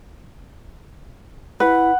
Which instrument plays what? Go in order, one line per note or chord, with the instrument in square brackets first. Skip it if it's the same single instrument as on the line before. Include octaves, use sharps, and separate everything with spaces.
[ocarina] E4 [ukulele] B4 [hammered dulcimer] F#5